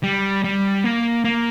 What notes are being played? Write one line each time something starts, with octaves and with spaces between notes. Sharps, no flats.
G3
G3
A#3
A#3